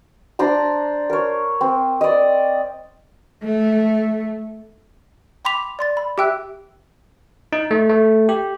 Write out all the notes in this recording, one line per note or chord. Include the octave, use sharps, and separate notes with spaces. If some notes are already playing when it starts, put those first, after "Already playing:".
D4 C5 D5 A#5
A#4 C#5
C4
D5 D#5
A3
G5 B5 C6 D6 B6 F7
D5 C6 A6
B5
G4 E5 G5 E6 F#6
D#4
A3
A3
G4